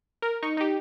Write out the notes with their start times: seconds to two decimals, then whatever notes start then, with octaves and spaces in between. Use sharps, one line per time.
0.22 A#4
0.43 D#4 C#6
0.57 D#4 G4